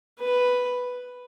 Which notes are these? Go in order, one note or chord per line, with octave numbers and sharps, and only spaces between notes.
B4